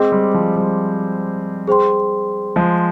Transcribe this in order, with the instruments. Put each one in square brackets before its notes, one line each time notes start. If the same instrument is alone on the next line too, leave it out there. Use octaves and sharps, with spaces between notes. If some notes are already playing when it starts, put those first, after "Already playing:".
Already playing: [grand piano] G#3 C4 [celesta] G#4 C5 D#5 G5 D6
[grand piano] G3
F3
G3
[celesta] G#4 C5 G5 C6
[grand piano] F3 G#3